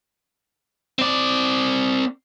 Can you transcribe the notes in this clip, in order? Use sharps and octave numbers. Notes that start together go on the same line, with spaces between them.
C4 D5